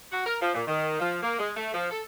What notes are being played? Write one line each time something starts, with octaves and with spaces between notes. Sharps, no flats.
F#4
A#4
F3
A#2
D#3
F3
A#3
G#3
A3
F3
A4